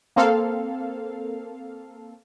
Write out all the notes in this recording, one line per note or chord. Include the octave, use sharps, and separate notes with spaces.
A#3 C4 A4 F5